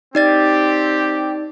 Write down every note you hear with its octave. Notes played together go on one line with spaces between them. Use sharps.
C4 D#4 G4 D5 A6